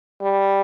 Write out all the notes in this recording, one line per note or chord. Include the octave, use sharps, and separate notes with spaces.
G3